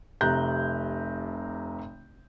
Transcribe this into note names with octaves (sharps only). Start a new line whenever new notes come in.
F1 C3 A#5 F#6 G6